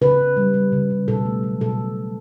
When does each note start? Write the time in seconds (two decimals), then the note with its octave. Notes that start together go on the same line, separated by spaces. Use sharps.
0.01 C#3 B4
0.19 C#3
0.37 G3
0.54 G3
0.72 C#3
0.90 C#3
1.08 B2 A4
1.25 A3
1.43 F#3
1.61 B2 A4
1.79 B2
1.96 A3